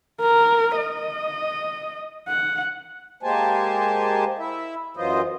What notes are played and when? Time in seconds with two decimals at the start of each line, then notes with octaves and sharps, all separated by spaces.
0.20 A#4
0.77 D#5
2.28 F#5
3.23 G#3 A#3 G4 C5 G#5 A5
4.38 E4 E5
4.97 F#2 E3 F#3 F4 C5 D#5